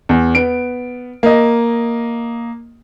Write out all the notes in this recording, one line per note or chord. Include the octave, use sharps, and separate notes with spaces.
E2
B3 D7
A#3 D#5